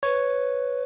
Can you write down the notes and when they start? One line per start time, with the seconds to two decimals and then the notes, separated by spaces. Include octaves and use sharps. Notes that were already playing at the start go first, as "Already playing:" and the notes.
0.03 B4 C#5